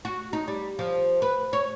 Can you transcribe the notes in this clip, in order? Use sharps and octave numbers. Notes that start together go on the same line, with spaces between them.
F#4
D#4
G3
F3
B4
C#5